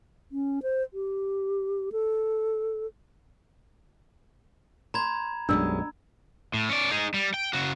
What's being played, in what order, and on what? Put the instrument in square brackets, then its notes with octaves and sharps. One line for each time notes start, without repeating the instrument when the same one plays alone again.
[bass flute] C#4
C5
G4
A4
[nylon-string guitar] C5 [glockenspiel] A#5 B5 G#6
[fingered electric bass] B1 F#2 [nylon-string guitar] B2 G3 G#3 [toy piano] D4 E6
[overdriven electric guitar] A2
C#4 D5
D#4 G#4
G3
G5
C#3 F#4